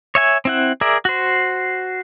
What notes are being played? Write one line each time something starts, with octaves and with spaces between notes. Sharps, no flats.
C#5 E5 G#5
C4 E4 F#5
G#4 A#4 D5 E5
F#4 C5